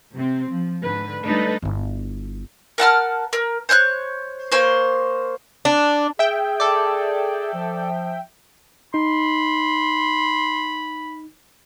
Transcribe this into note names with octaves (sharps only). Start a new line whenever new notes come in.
C3 C4
F3
G#2 D3 B4
G3 A3 D4 D#4 A4 B4
G1 E4
A#4 F#5 A5 F6
A#4
C5 C#5 F6 F#6
A#3 C5 C#5
D4
G#4 E5 G5
A4 D5
F3
D#4 B5 C6